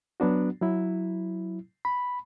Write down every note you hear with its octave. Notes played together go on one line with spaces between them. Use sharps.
F#3 B3 D4 F#4
F#3 E4
B5